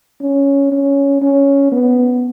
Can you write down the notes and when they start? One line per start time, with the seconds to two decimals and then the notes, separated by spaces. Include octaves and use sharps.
0.21 C#4
0.72 C#4
1.22 C#4
1.72 B3